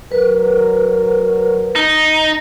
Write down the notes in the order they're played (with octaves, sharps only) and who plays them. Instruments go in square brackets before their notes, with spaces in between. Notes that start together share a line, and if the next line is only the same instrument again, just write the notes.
[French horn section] F#3 A#4 [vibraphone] B4
[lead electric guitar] D#4